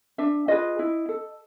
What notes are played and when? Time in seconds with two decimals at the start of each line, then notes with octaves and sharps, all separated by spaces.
0.18 D4 E5
0.48 F4 G#4 B4 D#5
0.79 E4
1.09 A4